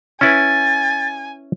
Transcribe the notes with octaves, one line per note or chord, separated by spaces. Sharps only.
C#4 E4 B4 G#5 A6